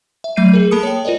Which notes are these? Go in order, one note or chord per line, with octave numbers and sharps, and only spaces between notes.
E5
F#3 A3 E5 G6 C7 D#7
G#4 A#4
A#3 A4 A5 B5 D#6 C#7
C#5 G5
F4 A#4 C5 D5 D#5